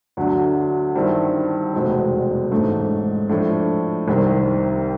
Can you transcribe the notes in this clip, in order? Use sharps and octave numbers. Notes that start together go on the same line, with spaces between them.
D2 D3 F#3
G2 D#3 G3 C4 E4
F1 E2 B2 G#3 C4
A1 G#2 E3 A3 C4
A2 F3 A3 D4
C2 C3 D#3 G3 C4